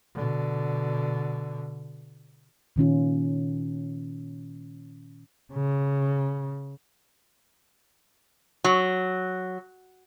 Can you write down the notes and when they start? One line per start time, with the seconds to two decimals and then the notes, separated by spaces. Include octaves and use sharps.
0.14 B2 D3
2.76 A#2 D#3 C#4 F4
5.53 C#3
8.64 F#3